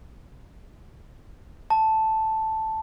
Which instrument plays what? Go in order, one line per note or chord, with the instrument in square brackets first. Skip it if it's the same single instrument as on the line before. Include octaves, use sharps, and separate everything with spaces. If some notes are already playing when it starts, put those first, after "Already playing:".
[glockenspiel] A5